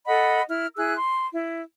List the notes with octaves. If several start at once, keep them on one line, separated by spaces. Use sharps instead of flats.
A4 D#5 F#5 B5
E4 F6
E4 G#4 E6 F#6
C6
E4